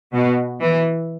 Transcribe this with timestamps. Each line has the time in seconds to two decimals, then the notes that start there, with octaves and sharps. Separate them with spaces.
0.13 B2
0.61 E3